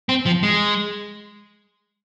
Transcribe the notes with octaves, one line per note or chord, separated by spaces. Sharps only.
C4
F3
G#3